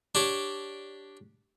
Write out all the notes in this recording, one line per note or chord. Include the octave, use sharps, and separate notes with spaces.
D4 G4 C#5